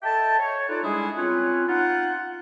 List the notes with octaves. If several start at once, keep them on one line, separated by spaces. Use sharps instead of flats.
A4 D#5 E5 G5 A5
C#5
D#4 F4 A4 B4 C#5 D5
G3 G#3 D4 E4 G#4
C4 C#4 F4 B4 C#5
D#4 F4 F#5